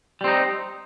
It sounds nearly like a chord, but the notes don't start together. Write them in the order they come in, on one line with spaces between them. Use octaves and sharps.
G3 C4 D#4